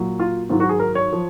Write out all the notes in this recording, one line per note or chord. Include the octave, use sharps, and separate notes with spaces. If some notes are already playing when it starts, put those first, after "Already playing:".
Already playing: A#2 F#3
F4
G#2 D#3 F#3 F4
F#4
G#4
A#4
C#5
F3